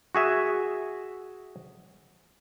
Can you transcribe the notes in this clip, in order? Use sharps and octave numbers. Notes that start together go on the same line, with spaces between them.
F#4 G#4 E5